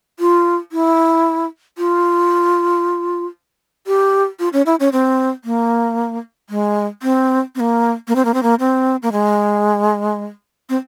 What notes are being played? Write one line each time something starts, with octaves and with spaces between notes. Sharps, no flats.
F4
E4
F4
G4
F4
C#4
E4
C#4
C4
A#3
G#3
C4
C4
A#3
A#3
C4
A#3
C4
A#3
C4
A#3
G#3
C4